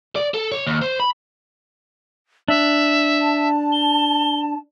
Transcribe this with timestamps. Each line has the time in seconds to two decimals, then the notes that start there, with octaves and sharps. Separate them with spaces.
0.16 D5
0.34 A4
0.52 C#5
0.67 D#2
0.82 C5
1.00 B5
2.48 D4 E5
3.16 A5
3.72 G7